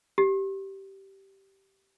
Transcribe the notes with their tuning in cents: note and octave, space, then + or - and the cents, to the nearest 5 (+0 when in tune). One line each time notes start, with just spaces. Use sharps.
G4 -15